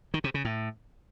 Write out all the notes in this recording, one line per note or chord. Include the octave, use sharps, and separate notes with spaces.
D#3
C3
C#3
A2